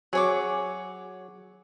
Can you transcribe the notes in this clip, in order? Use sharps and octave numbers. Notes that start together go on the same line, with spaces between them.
F#3 G#4 C#5 D6